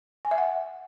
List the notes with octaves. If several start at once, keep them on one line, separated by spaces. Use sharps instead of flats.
G#5
E5
F#5